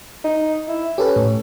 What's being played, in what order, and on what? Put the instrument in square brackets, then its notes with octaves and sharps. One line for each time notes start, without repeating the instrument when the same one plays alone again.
[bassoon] D#4
E4
[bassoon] C#4 [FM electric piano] G4 A4 B4
[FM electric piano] A2